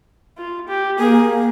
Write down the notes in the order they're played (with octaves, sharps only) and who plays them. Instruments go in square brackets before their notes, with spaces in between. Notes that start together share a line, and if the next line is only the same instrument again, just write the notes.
[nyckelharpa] F4
G4
[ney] A#3 [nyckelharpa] G#4